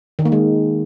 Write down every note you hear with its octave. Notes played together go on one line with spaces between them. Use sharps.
D#3
A#3
G#3